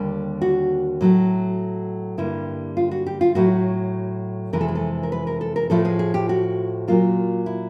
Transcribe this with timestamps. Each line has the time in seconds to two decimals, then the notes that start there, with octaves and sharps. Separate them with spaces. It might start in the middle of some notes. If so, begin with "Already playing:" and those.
Already playing: D#2 D3 G3 A#3
0.41 F#4
1.01 A2 F#3 A3
2.18 G2 D3 G3 A#3 E4
2.77 F4
2.91 F#4
3.07 G4
3.21 F4
3.35 A2 F#3 A3 F#4
4.53 F2 C3 E3 G#3 A#4
4.61 A4
4.68 G#4
4.75 A4
5.03 A#4
5.12 B4
5.27 A#4
5.41 A4
5.56 A#4
5.70 A2 F3 A3 A4
5.85 G#4
5.99 G#4
6.14 G4
6.29 F#4
6.88 A#2 F#3 A#3 F4
7.46 E4